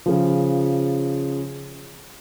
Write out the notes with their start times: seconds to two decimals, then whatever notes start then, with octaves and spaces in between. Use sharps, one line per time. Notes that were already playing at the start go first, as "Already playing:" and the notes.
0.06 C#3 F3